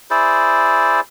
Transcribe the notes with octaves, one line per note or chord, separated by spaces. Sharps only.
E4 G#4 C5 D5